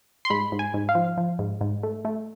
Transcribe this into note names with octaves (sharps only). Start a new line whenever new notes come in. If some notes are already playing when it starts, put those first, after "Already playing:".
C6
G#2 B5
G#2
G#5
G#2
F5
F3
F3
G#2
G#2
A3
A3